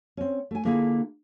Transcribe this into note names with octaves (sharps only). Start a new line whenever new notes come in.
C4 C#4
A3 G#5
D3 A#3 E4 F4 G#4